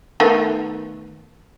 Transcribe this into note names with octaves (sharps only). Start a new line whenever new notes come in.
D#3 A3 B3